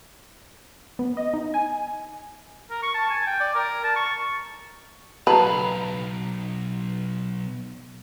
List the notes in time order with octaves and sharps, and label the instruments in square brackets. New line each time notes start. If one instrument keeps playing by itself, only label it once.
[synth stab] B3
D#5
D#4
G#5
[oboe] A#4
C#6
A5
G#5
G5
D5
A#4
A5
C#6
[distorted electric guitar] B1 F5 [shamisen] B4 [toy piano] A5 A#5